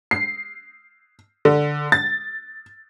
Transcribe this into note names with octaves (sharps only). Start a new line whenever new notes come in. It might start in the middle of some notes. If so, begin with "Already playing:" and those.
C7
D3
A6